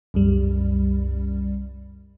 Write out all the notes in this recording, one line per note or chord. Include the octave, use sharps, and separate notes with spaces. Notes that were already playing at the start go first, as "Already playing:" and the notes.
C2 F#2 G3